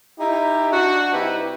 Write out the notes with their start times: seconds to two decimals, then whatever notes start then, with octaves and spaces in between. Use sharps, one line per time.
0.19 D#4 E4 G4
0.72 D4 F#4
1.13 C3 G3 D#4 E4 G4 B4